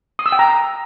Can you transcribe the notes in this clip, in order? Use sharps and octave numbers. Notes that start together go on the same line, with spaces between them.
D#6
E6
G5
A#5